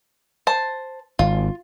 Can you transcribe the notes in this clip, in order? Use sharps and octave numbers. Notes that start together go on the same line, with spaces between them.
C5 A5
G#1 F4